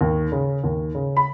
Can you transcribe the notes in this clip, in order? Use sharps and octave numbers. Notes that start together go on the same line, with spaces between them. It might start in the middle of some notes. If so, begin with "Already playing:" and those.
D#2
C#3
D#2
C#3
B5